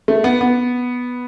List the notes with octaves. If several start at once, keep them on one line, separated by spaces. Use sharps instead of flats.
A3
B3
B3